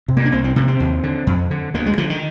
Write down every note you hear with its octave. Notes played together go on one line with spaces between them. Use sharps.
C3
A#3
D4
C2 C4
C4
C3 A#3
C4
D#2
D3
F2
D3
D2 A#3
G#3
D3 F3
D#3